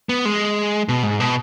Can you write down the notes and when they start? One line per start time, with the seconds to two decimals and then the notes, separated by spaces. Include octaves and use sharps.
0.09 B3
0.25 G#3
0.89 B2
1.03 G#2
1.20 B2